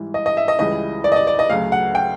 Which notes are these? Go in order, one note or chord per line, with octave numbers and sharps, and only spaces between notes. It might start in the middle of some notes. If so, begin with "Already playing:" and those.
Already playing: G#2 E3 G3
D#5
D#5
E5
D#5
C#2 C#3 E3 G3 D#5
D5
D#5
D5
D5
D#5
D2 C#3 F#3 F5
F#5
G5